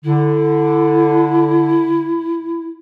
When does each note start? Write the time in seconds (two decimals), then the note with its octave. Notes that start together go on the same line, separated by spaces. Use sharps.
0.04 D3 E4